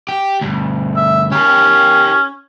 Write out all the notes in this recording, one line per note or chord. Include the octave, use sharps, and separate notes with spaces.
G4
D2 G2
E5
C#4 G4 A#4